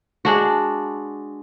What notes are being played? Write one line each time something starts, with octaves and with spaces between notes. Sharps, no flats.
G#3 D4 F#4